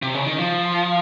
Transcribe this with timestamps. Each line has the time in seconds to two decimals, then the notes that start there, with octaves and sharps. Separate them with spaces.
0.02 C3
0.15 C#3
0.26 D#3
0.38 F3